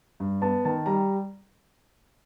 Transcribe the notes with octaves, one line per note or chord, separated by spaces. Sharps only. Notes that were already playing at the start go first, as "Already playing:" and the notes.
G2
B3 A5
D#3 A5
G3 A#5